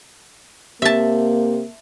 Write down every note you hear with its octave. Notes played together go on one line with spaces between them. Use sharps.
C3 A#3 E5 A5